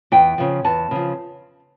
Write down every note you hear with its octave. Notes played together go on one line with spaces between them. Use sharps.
E2 G5
C#3 F3
E2 A5
C#3 F3